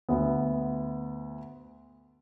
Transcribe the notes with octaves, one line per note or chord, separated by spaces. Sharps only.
D2 B3